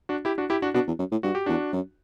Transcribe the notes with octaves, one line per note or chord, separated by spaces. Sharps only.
D4 F#4
E4 G4
D4 F#4
E4 G4
D4 F#4
B2 D4 F#4
E2
F#2
A2
G2 F#4
G4
E2 D4 F#4
F#2